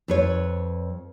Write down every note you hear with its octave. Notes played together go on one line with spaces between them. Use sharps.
F2 B4 C#5